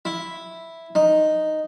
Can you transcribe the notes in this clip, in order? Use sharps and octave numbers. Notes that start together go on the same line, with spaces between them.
E4
D#4